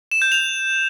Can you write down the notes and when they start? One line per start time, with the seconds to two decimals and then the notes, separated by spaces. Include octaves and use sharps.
0.11 E7
0.22 G6
0.32 F7